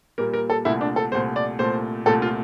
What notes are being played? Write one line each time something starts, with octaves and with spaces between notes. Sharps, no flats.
A#2 G3 A#3 A#4
A#4
A4
C2 A#2 A3 E4
D4
A4
C2 A#2 A3 C5
D5
C2 A#2 A3 C5
C2 A#2 A3 A4
F4